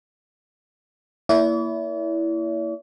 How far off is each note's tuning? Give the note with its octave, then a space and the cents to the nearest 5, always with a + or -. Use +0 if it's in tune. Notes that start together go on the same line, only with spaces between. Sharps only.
A#3 +0 E4 +0 D5 -45